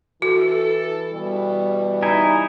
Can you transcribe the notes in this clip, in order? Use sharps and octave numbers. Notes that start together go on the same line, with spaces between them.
E3 F#4 A4
B2 E3 G3
D#4 E4 G#5